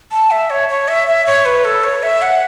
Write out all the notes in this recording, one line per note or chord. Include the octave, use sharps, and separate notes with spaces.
A5
E5
C#5
C#5
E5
E5
C#5
B4
A4
C#5
E5
F#5